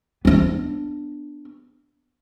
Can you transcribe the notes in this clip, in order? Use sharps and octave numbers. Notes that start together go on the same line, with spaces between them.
B3 D4